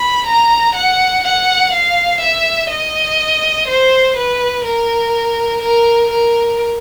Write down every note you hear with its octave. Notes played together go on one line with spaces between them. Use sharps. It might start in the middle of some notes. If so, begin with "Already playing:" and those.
Already playing: B5
A#5
F#5
F#5
F5
E5
D#5
C5
B4
A#4
A#4
A#4